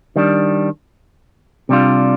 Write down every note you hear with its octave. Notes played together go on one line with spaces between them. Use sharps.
D#3 G3 D4
C3 G3 D4 F4